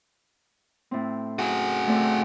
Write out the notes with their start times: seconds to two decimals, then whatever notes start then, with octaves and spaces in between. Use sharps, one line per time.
0.91 A2 C4
1.39 F#4 G#4
1.87 A3 C4 D5